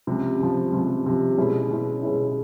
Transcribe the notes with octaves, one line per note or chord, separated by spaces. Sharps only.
C#2 C3 F3
C#2 C3 F3
C#2 C3 F3
C#2 C3 F3
B2 G#3 C#4 E4
B2 G#3 C#4 E4
B2 G#3 C#4 E4